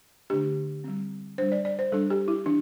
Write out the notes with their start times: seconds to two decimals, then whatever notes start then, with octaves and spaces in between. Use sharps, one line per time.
0.30 D3 A3 D4 G4
0.84 G3 C4
1.38 G3 D4 C5
1.52 D5
1.65 D5
1.79 C5
1.92 G3 D4 A4
2.10 G4
2.28 E4
2.46 E3 D4